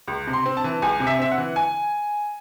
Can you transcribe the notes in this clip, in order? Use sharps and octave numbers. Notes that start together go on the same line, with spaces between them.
C#2
C3
C6
C4
A5
E3
C#2 G#5
C3
E5
C4 E5
F#5
E3
G#5